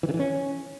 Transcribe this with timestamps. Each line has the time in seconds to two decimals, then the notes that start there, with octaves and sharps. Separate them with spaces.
0.03 E3
0.09 C#3
0.14 E3
0.19 C#4